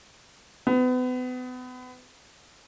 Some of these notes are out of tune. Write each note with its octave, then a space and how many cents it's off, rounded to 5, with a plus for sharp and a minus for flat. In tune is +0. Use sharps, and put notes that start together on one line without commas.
B3 +35